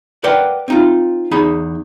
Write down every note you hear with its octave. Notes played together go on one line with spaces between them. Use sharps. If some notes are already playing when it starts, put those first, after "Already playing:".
A#4 B4 D5 F#5 G5
C4 D#4 F4
E2 D#4 G#4 B5